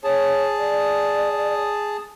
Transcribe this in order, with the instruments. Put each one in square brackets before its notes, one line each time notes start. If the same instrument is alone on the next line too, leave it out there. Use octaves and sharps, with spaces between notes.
[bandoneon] G#4 A5 [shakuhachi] C#5
[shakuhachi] D5